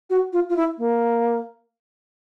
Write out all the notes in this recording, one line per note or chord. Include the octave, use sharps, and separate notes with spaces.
F#4
F4
F4
E4
A#3